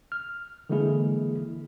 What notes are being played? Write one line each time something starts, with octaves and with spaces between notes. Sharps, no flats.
F6
D3 E3 G#3 A#3 E4 G#4